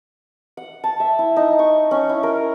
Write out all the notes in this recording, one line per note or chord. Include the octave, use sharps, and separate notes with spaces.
F#5
A5
E5
E4
D#4
C#6
C#4
E4
A#4